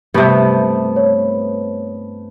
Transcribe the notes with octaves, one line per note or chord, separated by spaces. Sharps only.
G2 C3 A3 B3
C#5